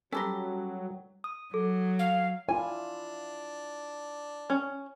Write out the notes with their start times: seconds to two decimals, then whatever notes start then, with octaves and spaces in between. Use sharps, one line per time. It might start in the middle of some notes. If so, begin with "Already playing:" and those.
0.12 F#3 G3 C#4 G4 A4 B4 A#5 C6
1.24 D#6
1.54 F#3 A4
1.99 F5
2.49 D4 E4 F4 G#5
4.50 C#4